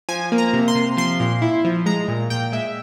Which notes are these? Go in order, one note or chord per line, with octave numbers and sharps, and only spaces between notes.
F3 G#5
A#3
A#5
C3
C6
C3
F3 C6
A#2
E4
F3
G#3 A#5
A#2
A#2 G5
G#3 E5